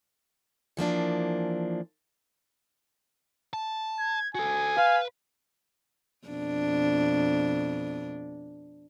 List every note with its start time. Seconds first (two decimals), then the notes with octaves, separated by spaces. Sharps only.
0.77 E3 F3 A#3 D4
3.53 A5
3.99 G#6
4.35 F#4 A4 G#5
4.77 B4 F5
6.27 F2 B2 D4